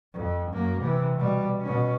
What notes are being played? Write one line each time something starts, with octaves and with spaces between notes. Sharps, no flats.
F2
F#2 A#3
C3 E3
B2 G3
B2 C#4